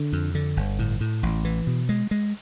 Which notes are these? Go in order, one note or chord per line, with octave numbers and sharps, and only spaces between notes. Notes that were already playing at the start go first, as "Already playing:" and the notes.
Already playing: D3
F2
D3
G1
A2
A2
A1
E3
B2
G#3
G#3